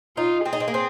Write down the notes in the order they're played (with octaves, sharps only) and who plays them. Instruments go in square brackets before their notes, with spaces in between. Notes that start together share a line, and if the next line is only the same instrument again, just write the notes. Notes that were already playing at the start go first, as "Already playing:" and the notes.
[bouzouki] D#4 [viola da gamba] F4
[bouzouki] C4 [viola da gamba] G#4
[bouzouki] D#4
C4
A#3
C4